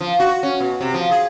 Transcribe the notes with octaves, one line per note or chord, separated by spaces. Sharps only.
F3
F#4
C#4
B2
C3
F3
G#4